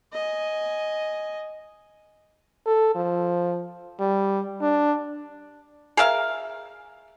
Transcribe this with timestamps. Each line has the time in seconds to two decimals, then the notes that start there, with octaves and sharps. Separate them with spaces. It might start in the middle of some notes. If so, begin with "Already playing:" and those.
0.13 D#5 G#5
2.66 A4
2.95 F3
4.00 G3
4.62 D4
5.97 G#4 A#4 E5 F5